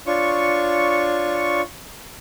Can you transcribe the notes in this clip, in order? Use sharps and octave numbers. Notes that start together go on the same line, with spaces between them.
D4 F4 C#5 C#6